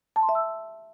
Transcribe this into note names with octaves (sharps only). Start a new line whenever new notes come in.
A5
C6
E5
E6